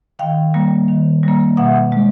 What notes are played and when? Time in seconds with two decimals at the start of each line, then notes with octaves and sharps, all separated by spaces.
0.19 D#3 F5 G5
0.54 G3 A#3
0.88 D#3
1.23 G3 A#3
1.57 B2 E5 F#5
1.92 G#3